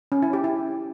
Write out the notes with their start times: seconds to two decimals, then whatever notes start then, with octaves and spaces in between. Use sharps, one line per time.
0.12 C#4
0.22 E4
0.33 G4
0.44 E4